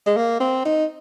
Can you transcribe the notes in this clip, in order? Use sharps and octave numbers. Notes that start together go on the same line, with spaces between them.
G#3
A#3
C4
D#4